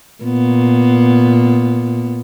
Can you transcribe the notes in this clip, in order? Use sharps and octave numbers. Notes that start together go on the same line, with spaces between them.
A#2 B3